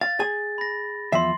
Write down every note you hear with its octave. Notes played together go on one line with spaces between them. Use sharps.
F5 A6
G#4 G#5
B5 A#6
E2 F3 E5 C6 C7